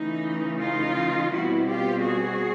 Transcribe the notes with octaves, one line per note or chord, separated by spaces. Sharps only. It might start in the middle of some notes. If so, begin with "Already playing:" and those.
Already playing: C#3 E3 A3 C#4 D#4
D#4 F4
B2 G3 C4 E4 F#4
F4 G4
F#4 G#4